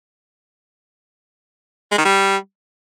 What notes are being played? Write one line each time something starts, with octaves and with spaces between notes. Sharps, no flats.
G#3
D#3
G3